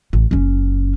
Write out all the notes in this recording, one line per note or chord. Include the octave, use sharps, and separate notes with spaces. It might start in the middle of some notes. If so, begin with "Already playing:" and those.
A1
F#1 C#4